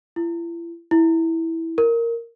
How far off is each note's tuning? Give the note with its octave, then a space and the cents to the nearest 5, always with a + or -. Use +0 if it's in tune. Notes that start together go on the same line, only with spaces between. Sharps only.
E4 +40
E4 -10
A#4 -5